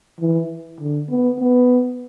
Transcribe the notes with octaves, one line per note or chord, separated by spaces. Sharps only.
E3
D3
B3
B3